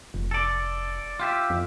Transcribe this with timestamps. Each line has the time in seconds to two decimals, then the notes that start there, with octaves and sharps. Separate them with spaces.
0.14 F1
0.31 A4 D5
1.20 F4 G4 E5
1.50 F2